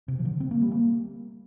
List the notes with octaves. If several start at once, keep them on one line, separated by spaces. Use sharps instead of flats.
C3
F3
D3
C4
A#3
G3
A#3